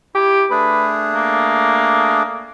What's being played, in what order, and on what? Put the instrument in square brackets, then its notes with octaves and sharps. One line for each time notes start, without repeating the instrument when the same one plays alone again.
[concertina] E4 [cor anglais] G4
[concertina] A3 D4 G#4 [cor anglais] B4
[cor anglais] A#3